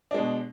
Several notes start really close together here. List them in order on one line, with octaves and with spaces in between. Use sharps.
D4 G#3 B2